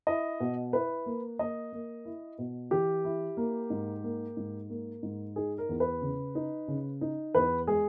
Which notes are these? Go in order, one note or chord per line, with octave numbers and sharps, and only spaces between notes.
E4 D#5
B2
E4 B4
A#3
A#3 D#5
A#3
E4
B2
E3 G4
E4
A#3
G#2
A#3
G#2
A#3
G#2
D#4 G#4
A#4
E2
B4
C#3
D#4
C#3
D#4
E2 B4
G#3 G#4